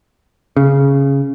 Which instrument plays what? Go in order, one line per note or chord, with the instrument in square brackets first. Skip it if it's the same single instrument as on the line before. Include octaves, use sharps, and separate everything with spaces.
[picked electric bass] C#3